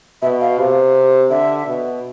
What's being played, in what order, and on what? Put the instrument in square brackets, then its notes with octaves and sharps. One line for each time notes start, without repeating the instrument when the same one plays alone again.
[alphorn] B2 [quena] E5
[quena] F5
[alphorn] C3
[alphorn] D3 [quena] E5
[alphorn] B2